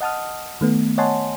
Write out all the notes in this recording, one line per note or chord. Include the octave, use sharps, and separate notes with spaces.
D#5 F#5 A5 D#6 F6
D#3 A3 B3
C#5 D#5 F#5 G#5 A5 C6